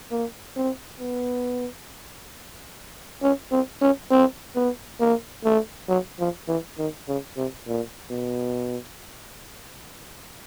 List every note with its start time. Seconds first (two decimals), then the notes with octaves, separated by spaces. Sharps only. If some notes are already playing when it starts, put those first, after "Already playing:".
0.11 A#3
0.56 C4
1.00 B3
3.23 C#4
3.51 C4
3.81 C#4
4.11 C4
4.56 B3
5.00 A#3
5.45 A3
5.89 F#3
6.19 F3
6.48 E3
6.78 D#3
7.08 C#3
7.37 C3
7.68 A#2
8.11 B2